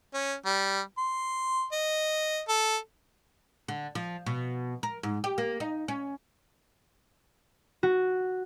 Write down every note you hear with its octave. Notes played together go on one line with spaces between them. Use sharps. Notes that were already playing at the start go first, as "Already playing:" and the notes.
C#4
G3
C6
D#5
A4
D3
F3
B2
A#4
G#2
G4
A#3
D#4
C#4
F#4